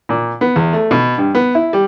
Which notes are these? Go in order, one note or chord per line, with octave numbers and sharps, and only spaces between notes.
A#2
B3
E2
A3
B2
G2
B3
E4
G3